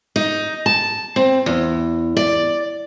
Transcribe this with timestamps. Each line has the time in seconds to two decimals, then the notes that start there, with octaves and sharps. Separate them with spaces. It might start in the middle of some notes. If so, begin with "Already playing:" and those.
0.16 D#4
0.66 A5
1.16 C4
1.46 E2
2.17 D5